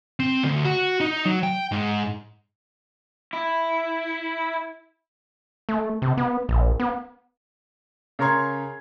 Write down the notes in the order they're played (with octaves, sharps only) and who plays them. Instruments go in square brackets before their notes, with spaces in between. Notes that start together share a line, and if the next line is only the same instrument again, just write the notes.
[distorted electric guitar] C4
D2
F#4
D#4
F#3
G5
G#2
[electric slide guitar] E4
[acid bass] A3
C3
B3
A#1
B3
[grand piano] C#3 A#4 C#5 A#5 C6 G#6